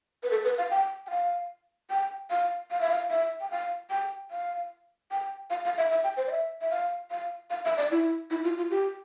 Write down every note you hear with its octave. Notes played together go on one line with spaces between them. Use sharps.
B4
A4
B4
F5
G5
G5
F5
G5
F5
F5
E5
F5
E5
G5
F5
G5
F5
G5
F5
F5
E5
E5
G5
C5
D5
E5
E5
F5
F5
F5
E5
D5
E4
E4
F4
F4
G4